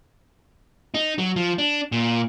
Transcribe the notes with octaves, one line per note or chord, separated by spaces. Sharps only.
D#4
F#3
F3
D4
A#2